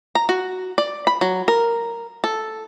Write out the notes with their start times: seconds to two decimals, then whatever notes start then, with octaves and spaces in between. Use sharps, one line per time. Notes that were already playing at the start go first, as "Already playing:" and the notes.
0.15 A#5
0.29 F#4
0.78 D5
1.07 B5
1.21 F#3
1.48 A#4
2.24 A4